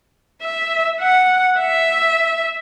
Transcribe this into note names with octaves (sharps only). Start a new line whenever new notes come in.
E5
F#5
E5